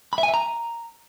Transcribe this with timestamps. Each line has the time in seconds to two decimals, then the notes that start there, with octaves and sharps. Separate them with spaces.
0.13 B5
0.18 E5
0.23 G#5
0.28 E5
0.34 A#5